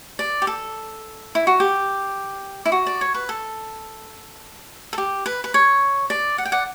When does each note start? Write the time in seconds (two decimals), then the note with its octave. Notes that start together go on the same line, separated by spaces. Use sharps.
0.19 D5
0.42 G4
0.47 A4
1.35 E4
1.47 F#4
1.60 G4
2.66 E4
2.72 F#4
2.87 D5
3.01 C#5
3.14 B4
3.29 A4
4.93 A4
4.98 G4
5.26 B4
5.44 B4
5.54 C#5
6.10 D5
6.38 F#5
6.45 G5
6.52 D5 F#5